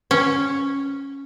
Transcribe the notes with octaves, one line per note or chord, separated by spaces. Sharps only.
C#4